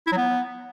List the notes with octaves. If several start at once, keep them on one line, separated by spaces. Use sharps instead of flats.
E4
F#3
B3